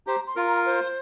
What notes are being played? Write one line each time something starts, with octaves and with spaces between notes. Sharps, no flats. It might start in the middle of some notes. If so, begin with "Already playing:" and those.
G4 C5 A#5
C6
F4 A#4
A#5
C5